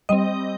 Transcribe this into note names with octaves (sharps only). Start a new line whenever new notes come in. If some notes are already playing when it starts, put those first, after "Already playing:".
G3 C4 D#5